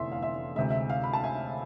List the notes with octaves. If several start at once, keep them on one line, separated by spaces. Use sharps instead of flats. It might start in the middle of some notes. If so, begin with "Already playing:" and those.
Already playing: F1 E2 D3 A3 E5 C6
F5
E5
D2 C3 G#3 E5
E5
F5
B5
A5
E5 G#5